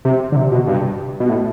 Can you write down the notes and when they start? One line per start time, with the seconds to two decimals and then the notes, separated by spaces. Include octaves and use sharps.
0.05 C3
0.32 D3
0.36 C3
0.51 B2
0.67 G2
1.20 B2
1.30 A2